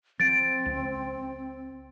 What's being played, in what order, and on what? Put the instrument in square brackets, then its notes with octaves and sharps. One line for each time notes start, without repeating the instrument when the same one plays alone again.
[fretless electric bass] F3 [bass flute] C4 [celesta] A6 D7
[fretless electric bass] C#2